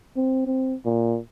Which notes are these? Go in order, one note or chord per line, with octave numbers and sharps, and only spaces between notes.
C4
C4
A#2